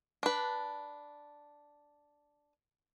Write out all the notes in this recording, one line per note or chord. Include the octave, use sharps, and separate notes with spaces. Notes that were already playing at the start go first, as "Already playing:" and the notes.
D4 B4